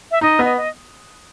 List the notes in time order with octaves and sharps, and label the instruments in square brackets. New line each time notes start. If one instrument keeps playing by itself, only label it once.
[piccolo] E5
[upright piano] D#4 [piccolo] D#5
[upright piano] B3
[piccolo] D#5
D#5